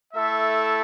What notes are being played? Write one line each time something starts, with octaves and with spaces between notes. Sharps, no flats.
A3 E4 A4 E5